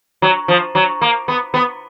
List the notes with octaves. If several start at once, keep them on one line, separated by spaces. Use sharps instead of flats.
F#3
F3
F#3
A#3
B3
B3